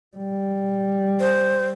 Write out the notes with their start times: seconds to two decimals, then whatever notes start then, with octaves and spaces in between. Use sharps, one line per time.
0.17 G3
1.20 C5